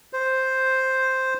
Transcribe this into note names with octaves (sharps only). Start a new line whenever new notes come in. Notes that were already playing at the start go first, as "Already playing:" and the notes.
C5